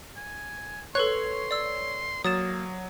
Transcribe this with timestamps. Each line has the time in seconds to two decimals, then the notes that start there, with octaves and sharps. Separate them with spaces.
0.17 G#5
0.95 A4 B4 C#5 C6 F#6
1.51 D5 E6
2.24 F#3 A#3 D#6 A6 E7